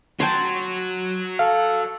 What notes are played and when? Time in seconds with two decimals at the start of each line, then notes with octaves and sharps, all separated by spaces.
0.20 F#4 C#5 G5 A5 C6
1.39 A4 F5